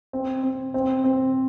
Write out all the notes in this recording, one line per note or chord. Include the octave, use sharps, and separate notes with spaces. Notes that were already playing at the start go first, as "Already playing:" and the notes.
C4
C4
C4
C4